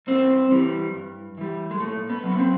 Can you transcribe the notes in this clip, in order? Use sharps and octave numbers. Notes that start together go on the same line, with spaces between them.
G2 C4
E3 G3
G2
E3 G3
G#3
A#2 A3
B3
F#3
B3
C4